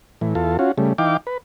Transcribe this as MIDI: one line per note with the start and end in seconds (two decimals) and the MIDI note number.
0.21 0.34 45
0.21 0.34 52
0.35 0.57 40
0.35 0.57 65
0.35 0.57 69
0.59 0.72 61
0.59 0.72 65
0.59 0.72 66
0.78 0.93 49
0.78 0.93 55
0.78 0.93 57
0.98 1.17 52
0.98 1.17 63
0.98 1.17 77
0.98 1.17 79
0.98 1.17 86
1.27 1.38 71